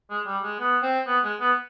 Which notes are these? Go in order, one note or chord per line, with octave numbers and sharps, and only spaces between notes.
G#3
G3
G#3
B3
C4
B3
G#3
B3